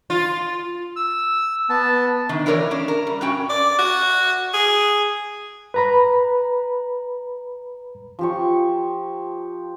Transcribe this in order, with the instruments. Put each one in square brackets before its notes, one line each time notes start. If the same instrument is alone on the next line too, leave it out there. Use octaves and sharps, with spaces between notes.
[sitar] F4
[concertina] E6
B3 A5
[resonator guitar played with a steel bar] D#3 D4
E3 F#3 A#3 A#4 C#5 D5
C#4 D4
A#4
G3
G2 C#4 F#4 G5
[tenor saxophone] D5
F#4
G#4
[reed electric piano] B4 A#5 B5
[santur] F3 G4 C#6